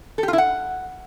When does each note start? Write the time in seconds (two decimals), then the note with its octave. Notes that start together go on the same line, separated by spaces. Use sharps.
0.18 A4
0.23 G4
0.28 F4
0.33 E4
0.38 F#5